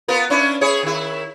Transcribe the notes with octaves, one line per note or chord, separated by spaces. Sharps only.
B3 F4 A#4
C#4 D4 E4
E4 G#4 C#5
D#3 E4